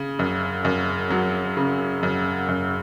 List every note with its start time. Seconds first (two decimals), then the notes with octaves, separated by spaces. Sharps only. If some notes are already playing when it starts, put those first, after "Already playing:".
Already playing: C#3
0.19 F#2
0.65 F#2
1.10 F#3
1.57 C#3
2.03 F#2
2.48 F#2